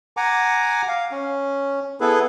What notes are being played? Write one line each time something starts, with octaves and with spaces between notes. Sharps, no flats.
F#5 G#5 A#5 D6
F5
C#4
B3 E4 G#4 A4 B4